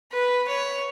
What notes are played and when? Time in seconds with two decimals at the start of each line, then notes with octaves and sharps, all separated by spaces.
0.12 B4
0.48 C#5